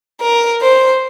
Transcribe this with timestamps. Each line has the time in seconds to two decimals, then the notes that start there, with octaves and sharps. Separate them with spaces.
0.21 A#4
0.62 C5